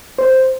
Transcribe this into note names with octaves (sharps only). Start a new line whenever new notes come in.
C5